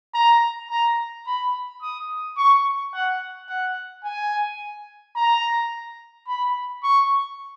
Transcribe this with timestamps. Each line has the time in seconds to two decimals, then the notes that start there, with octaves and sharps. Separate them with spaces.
0.14 A#5
0.70 A#5
1.27 B5
1.82 D#6
2.37 C#6
2.94 F#5
3.50 F#5
4.04 G#5
5.16 A#5
6.27 B5
6.84 C#6